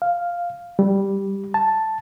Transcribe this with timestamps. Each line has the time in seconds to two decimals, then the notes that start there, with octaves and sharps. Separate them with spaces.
0.02 F5
0.79 G3
1.54 A5